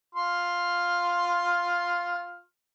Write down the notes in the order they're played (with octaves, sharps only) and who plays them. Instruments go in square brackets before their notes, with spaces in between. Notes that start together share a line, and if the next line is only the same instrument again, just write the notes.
[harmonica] F4 C6 F6